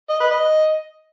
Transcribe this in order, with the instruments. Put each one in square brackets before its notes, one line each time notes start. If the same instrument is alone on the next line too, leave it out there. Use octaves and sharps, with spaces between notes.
[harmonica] D#5
B4
D#5